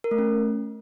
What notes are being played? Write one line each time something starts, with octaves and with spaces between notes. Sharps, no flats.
A#4
A3
C#4